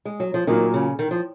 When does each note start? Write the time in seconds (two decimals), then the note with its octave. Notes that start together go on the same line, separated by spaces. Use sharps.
0.05 G#3
0.20 F#3
0.34 F3
0.47 A#2 D#3 F#3 A#3
0.74 C#3
0.99 D#3
1.11 F3